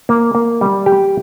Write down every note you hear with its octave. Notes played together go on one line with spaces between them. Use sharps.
A#3
A#3
G3
G4